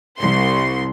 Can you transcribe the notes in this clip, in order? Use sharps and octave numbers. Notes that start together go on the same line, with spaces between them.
C2 C6